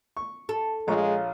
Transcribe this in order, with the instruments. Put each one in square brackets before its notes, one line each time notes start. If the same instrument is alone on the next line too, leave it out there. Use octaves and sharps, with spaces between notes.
[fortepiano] C#6
[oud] A4
[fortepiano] A#1 F4 C#6 [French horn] G#3 [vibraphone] C#5 F5 A#5